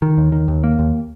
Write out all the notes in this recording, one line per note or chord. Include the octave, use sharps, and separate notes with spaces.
D#3
D#2
D#3
D#2
A#3
D#2